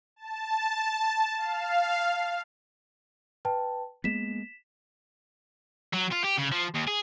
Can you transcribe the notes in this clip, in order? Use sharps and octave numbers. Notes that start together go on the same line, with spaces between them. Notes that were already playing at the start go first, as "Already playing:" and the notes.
A5
F5
B4 G5 A5
G#3 A#3 B3 B6 E7
F#3
F4
G4
C#3
F3
D#2
G#4